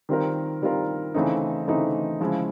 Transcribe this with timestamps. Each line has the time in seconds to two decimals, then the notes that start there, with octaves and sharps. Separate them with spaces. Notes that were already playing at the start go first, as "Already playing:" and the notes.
0.09 D#3 G3 C4 F4 A#4
0.62 D#3 G3 C4 F4 A#4
1.14 C#3 E3 A3 C4 D#4
1.67 C#3 E3 A3 C4 D#4
2.20 C#3 F3 G#3 C#4 E4